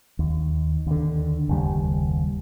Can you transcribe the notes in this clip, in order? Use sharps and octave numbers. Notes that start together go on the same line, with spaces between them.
D#2
D#2 D3
F#1 D#2 G3